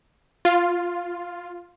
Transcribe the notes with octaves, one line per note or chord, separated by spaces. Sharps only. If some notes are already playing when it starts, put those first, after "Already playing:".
F4